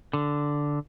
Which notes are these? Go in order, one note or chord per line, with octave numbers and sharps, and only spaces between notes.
D3